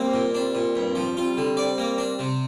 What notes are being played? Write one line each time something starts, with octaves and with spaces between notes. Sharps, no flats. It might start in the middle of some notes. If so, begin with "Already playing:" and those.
Already playing: G3 A#3 C4
A#2
G3 C4 D4
A#2
G2 G3 C4
F3
G3 C4 F4
D3
D5
A#3
D4
C3